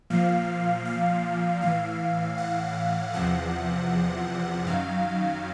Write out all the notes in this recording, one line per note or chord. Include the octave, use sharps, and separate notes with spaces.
A#2 F3 F5
F5
A2 E3 F5
F#5
E2 C3 F3 F#5
F#2 D#3 F#3 F5